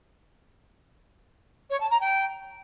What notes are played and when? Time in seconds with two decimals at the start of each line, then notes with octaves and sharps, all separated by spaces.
1.70 C#5
1.80 A5
1.90 A#5
2.00 G5